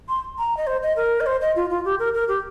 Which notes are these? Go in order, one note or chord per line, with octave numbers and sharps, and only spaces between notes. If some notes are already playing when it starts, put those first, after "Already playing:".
C6
A#5
D#5
C5
D#5
A#4
D#5
C5
D#5
F4
F4
G4
A#4
A#4
G4